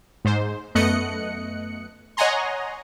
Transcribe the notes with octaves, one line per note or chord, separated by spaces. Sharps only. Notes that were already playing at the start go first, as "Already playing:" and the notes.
G#2 C5
F#2 A3 B3 D#5 F#6 C#7
C#5 D#5 F#5 G#5 A#5 C6